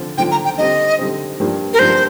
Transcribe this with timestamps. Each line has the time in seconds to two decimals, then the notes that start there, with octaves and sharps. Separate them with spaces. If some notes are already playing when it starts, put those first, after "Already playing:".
Already playing: D3 F3 C4 F4
0.18 D3 F3 C4 F4 G5
0.31 A#5
0.45 G5
0.58 D3 G3 C4 D#5
0.99 D3 G3 C4
1.40 G2 F3 A#3 D4
1.74 A#4
1.79 G2 F3 A#3 D4 C5